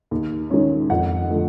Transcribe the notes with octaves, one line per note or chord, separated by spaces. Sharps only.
D#2
D#3 G#3 C#4
F2 F#5
D3 F3 A3